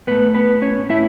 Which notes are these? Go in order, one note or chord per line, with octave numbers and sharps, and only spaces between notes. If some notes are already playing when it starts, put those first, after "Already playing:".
A2 A3 B3 B4
B3 B4
C#4 C#5
A2 A3 E4 E5